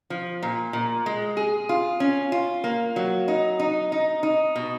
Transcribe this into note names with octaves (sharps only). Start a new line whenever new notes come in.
F3
A#2
A#2
G#3
G#4
F4
C#4
F4
A#3
F#3
D#4
D#4
D#4
D#4
B2